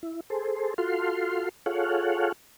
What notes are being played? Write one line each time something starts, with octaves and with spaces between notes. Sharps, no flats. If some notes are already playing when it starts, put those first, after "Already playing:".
E4
G#4 A4 C5
F4 F#4 A4 F5 C6
F4 G#4 A4 C#5 F5 F#5